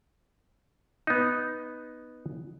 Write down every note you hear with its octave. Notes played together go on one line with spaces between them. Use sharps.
B3 D#4